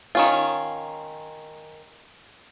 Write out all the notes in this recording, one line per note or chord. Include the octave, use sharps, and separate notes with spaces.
D#3 C#4 F4